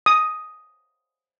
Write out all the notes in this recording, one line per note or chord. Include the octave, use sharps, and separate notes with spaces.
D#6